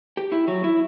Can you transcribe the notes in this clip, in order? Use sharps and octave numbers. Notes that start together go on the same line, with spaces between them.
G4
E4
F#3
E4